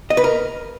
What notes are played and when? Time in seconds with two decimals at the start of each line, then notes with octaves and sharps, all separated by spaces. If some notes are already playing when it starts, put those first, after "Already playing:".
0.10 D#5
0.17 B4
0.24 A#4